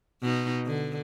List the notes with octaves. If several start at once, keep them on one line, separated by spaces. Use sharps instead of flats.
B2 D#4
D3